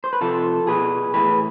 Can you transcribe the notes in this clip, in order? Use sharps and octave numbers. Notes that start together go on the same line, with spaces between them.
C5
B4
C3 F3 F4 A4
B2 G#4 B4
A2 E3 G#4 B4